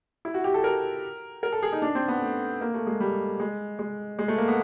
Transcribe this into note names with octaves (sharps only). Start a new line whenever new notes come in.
E4
F#4
G4
A4
A#4
A#4
A4
G#4
D#4
D4
C4
B3
A3
A#3
A3
G#3
G3
G#3
G#3
G#3
A3
A#3
B3